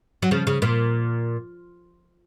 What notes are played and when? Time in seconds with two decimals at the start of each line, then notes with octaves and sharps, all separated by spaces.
0.22 F#3
0.31 C#3 F3
0.47 C#3
0.62 A#2